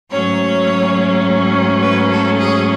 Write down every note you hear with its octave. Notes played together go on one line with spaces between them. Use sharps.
G#2 F#3 A3 C#4 C#5
B4
A4
G#4